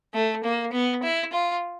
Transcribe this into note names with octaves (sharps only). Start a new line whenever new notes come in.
A3
A#3
B3
E4
F4